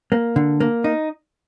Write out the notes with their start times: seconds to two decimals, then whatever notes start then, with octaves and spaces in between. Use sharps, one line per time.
0.12 A#3
0.36 D3
0.60 A#3
0.84 D#4